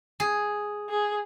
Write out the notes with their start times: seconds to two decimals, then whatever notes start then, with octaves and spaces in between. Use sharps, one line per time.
0.20 G#4
0.90 G#4